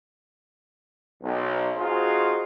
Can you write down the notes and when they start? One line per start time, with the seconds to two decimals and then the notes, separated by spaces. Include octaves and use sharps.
1.23 B1
1.77 C4 D#4 F4 F#4 G#4 C5